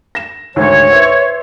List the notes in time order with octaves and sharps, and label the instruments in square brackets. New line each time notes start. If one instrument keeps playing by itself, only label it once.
[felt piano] A#6 E7
[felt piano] D2 G#2 D#3 [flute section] C#5
[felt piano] B4 C5 E5